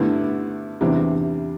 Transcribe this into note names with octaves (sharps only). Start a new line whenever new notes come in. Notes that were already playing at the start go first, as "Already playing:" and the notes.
Already playing: G2 D3 A3 E4
E2 C3 E3 G3 D4